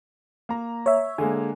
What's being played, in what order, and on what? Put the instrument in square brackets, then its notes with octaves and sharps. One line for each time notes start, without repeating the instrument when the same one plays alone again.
[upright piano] A#3 A#5
[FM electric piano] C#5 E5
[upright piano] D3 G#3 A#3 [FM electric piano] G#5